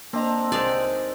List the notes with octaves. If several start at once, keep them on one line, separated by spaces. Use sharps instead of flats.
A#3 C4 D4 D#5 A#5
C2 C3 D#3 G#3 D5